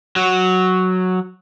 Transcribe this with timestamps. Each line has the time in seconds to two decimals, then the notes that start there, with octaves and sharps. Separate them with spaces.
0.16 F#3